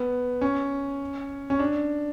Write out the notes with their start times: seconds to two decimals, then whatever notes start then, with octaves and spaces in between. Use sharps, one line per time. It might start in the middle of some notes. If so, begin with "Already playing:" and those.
Already playing: B3
0.41 C#4
1.50 C#4
1.59 D4